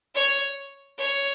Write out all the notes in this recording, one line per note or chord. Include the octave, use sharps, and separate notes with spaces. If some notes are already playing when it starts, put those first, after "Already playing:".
C#5
C#5